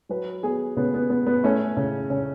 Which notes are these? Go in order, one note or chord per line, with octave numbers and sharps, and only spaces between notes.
F#3 B4
B3 G#4
C#3 B3
B3
B3
B3
A3 C#4
C#3
C#3